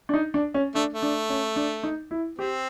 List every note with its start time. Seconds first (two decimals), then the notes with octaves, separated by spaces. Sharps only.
0.09 D4
0.14 D#4
0.34 D4
0.54 C#4
0.75 A3 D4
0.93 A3
1.02 D4
1.30 C#4
1.56 D4
1.83 D#4
2.11 E4
2.39 C4 G4